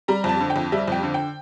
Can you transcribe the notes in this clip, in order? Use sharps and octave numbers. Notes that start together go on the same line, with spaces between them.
G3 A#5
F2 A5
D3
G5
F2
G3 E5
F2 G5
D3
G5